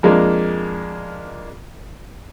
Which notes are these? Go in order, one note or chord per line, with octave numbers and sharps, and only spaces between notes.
F2 G#3 A#3 D4